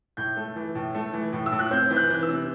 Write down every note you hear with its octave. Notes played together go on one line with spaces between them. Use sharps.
A2 G6
A3
E3
A2
A3
E3
A2
E6
A2
F#6
C4 G6
E3 G6
F#6
E3
E6
C3